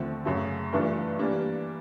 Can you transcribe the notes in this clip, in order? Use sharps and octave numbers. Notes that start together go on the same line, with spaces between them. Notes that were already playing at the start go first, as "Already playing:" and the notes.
Already playing: D#2 D3 F3 A3 C4
F#2 C#3 F#3 A3
G2 E3 A3 D4 F4
E3 G3 A#3 D4